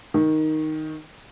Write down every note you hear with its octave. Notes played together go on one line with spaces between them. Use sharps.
D#3